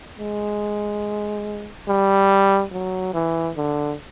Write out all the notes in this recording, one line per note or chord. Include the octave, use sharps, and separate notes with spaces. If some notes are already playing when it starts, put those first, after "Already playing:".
G#3
G3
F#3
E3
D3